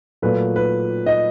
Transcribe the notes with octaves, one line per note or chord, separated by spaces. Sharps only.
A#2 F#3 A3 B4
B4
D#5